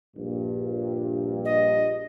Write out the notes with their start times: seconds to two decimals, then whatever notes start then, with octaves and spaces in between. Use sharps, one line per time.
0.16 A#1 G2
1.45 D#5